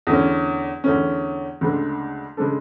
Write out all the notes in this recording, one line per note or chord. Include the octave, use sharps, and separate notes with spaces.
E2 D3 A3 C#4
E2 D3 A3 C#4
D2 C#3 G#3 D4 A4
C#3 G#3 D4 A4